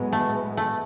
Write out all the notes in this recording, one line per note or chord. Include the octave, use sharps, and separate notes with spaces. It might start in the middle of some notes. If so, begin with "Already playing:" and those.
Already playing: A2 F#3 G#3 B3
A3
A3